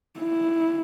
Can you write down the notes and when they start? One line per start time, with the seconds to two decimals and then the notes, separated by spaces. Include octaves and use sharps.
0.20 E4